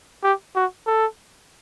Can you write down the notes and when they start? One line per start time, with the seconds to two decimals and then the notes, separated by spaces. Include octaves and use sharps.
0.23 G4
0.55 F#4
0.87 A4